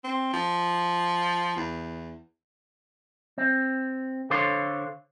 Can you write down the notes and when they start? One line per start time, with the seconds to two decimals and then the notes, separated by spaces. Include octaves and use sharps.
0.04 C4
0.33 F3
1.57 E2
3.38 C4
4.30 D3 A4 C5 C#5 F5 C6